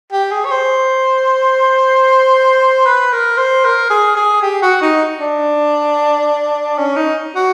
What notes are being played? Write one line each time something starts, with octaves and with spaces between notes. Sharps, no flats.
G4
G#4
C#5
C5
B4
A#4
C5
A#4
G#4
G#4
G4
F#4
D#4
D4
C#4
D#4
F#4